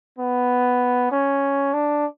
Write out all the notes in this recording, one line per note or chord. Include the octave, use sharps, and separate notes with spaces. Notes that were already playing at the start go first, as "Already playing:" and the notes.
B3
C#4
D4